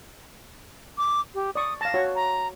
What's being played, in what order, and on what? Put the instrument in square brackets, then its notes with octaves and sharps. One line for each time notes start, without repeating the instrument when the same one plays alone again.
[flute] D6
G4
[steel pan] D5 C#6 [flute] D#6
[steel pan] F5 A5 [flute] A#6
[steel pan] F#4 C#5
[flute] A#5